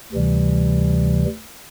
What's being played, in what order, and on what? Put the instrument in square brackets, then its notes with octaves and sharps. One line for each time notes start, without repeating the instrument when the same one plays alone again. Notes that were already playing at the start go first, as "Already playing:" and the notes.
[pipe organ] D2 C3 E3 G3